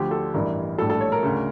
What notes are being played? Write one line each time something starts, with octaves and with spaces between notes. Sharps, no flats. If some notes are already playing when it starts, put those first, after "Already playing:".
Already playing: D2 D3 F3 G4
A4
A1 G2 E3 G3 A#4
A#1 A2 G3 A4
A4
C#5
A#4
D2 C#3